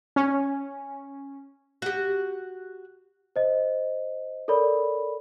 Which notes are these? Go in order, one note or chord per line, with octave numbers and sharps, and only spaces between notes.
C#4
F#4 G4
C5 D#5
A4 A#4 C#5 D5 B5